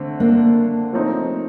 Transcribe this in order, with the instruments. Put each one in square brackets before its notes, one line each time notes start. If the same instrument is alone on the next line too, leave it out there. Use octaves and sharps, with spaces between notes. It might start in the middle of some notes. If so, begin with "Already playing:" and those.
Already playing: [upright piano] D3 A3 C4
[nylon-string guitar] A#3 D4
[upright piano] F3 A3 C4 D#4